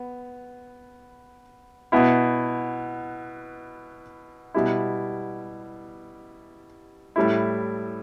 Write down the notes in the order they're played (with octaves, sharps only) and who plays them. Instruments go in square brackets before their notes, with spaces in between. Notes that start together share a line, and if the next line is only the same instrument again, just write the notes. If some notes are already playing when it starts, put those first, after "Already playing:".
Already playing: [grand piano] B3
B2 B3 E4
B2 G3 E4
A2 G3 E4